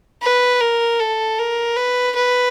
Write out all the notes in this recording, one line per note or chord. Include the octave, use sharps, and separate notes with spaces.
B4
A#4
A4
A#4
B4
B4